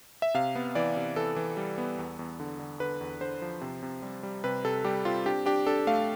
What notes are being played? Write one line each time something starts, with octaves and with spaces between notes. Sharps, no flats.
E5
C3 F5
B3
E3 D5
C3
E3 A4
E3
G3
B3
E2
E2
D3
D3
D3 B4
E2
D3 C5
F3
C3
C3
G3
G3
C3 B4
C3 A4
G3 G4
C4 F4
D4 G4
D4 G4
D4 A4
A3 F5